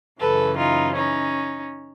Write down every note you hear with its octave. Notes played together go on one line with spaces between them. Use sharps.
F#2 C#3 E3 A4 B4
D#4 F4
C#4 D#4